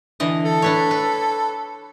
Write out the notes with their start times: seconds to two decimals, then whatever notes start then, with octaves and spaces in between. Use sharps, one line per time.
0.20 D3 E3 D#5
0.45 A4
0.62 D4 B4 C#5
0.91 B4